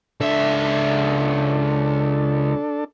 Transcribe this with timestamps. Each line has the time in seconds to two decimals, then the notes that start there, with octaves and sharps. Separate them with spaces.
0.20 C#2 D4 A4 E5